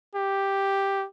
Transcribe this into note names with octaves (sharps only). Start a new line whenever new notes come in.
G4